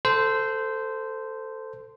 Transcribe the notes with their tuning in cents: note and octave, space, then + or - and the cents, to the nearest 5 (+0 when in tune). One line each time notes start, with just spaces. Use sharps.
A4 +10 C5 -15